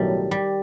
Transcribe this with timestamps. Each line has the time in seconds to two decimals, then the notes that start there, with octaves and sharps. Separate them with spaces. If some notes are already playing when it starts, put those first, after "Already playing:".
Already playing: B1 A2 D#3 F#3 G3
0.31 G3